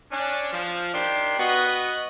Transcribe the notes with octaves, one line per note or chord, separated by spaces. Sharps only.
C#4 D4
F3
D#3 D4 G4 C6
B3 F#4 B4 D#5